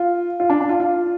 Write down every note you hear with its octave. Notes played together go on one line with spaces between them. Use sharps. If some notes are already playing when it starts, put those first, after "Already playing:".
Already playing: F4
F4
D4
D4
F4
F4